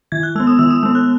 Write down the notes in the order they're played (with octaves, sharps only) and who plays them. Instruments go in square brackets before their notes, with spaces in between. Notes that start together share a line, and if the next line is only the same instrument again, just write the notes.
[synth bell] D#3 G#6
F#6
G#3 E6
B3
D#6
D#3 E6
D#6
G#3 B3 E6
F#6